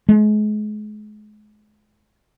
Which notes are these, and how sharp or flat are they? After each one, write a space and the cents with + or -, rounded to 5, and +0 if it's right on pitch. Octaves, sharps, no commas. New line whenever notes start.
G#3 +35